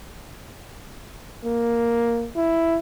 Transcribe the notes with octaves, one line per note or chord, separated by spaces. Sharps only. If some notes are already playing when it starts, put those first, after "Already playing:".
A#3
E4